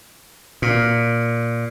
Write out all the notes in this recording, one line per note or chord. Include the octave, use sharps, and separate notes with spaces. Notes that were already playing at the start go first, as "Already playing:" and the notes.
A#2